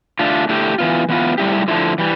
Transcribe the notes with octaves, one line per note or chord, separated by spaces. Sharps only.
D3 A3 D4 F4
D3 A3 E4 G4
E3 B3 F4
E3 B3 F4
A2 G3 B3 E4 G4
D3 F3 A3 E4
E3 G3